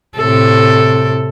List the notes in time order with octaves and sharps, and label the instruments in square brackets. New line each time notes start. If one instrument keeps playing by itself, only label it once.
[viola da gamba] A2 C3 A4